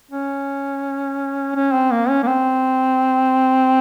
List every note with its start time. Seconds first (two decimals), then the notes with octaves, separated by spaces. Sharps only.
0.11 C#4
1.55 C#4
1.73 C4
1.91 A#3
2.09 C#4
2.23 A#3
2.27 C4